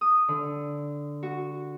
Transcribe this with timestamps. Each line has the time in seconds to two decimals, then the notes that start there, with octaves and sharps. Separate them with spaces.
0.01 D#6
0.28 D3
1.23 F#4